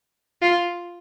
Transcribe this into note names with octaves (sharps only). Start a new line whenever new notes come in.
F4